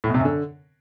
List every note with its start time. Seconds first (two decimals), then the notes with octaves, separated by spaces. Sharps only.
0.04 A2
0.09 B2
0.14 C3
0.20 F#2
0.25 D3